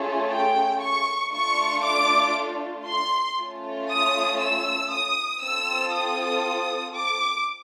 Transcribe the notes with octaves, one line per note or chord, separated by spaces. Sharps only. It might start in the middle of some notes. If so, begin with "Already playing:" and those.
Already playing: A3 C#4 F4 G#4
G5
C#6
A3 D4 F4 C#6
D6
C6
A3 C#4 F4
D#6
E6
D#6
C4 F4 A4 E6
D#6
D6